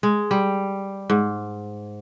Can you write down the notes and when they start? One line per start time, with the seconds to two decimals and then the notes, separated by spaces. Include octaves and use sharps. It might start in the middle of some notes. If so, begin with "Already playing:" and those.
0.03 G#3
0.31 G3
1.10 G#2